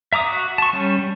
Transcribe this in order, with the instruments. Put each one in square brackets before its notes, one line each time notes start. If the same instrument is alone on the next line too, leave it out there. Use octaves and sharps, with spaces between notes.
[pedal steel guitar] E5 A#5 D6 D#6
F#4
A5 C#6
G3 C#4
G3